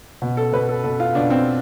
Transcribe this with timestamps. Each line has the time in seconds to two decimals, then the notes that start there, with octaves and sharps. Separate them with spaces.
0.22 B2
0.37 A4
0.53 B2 B4
0.69 A4
0.84 B2 A4
1.00 F4
1.15 B2 D4
1.30 C4